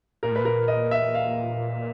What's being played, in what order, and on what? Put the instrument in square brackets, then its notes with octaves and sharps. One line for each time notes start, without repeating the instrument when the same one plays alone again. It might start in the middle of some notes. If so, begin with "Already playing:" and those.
[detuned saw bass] A#2 [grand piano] A#4
[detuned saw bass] A2
[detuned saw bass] A#2 [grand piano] B4
[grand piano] A#4
D#5
E5
F5